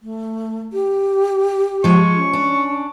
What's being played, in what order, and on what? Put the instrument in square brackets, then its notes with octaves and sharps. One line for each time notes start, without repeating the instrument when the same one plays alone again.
[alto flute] A3
G4
[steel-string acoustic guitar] F3 G#3 [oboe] C#6
[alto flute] C#4
[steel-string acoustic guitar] D4